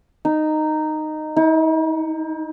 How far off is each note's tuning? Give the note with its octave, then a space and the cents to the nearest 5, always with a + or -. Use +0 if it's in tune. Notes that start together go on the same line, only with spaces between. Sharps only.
D#4 -10
D#4 +45